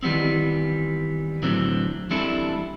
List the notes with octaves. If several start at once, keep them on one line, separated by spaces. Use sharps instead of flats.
D#3 E3 G3 B3 C4
A2 D3 E3 F#3 C4
E3 G3 C4 D4 E4 A4